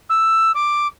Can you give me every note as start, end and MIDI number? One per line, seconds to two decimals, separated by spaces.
0.09 0.52 88
0.55 0.87 86